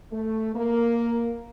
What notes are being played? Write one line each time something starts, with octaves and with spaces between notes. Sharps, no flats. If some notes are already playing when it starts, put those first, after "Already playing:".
A3
A#3